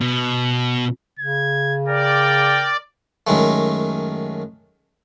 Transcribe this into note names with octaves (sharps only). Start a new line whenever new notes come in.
B2
C#3 G#6
A#4 D5 G5
F#2 D#3 G#3 A3